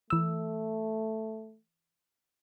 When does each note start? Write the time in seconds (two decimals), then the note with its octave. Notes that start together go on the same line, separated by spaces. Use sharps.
0.10 E3 A3 E6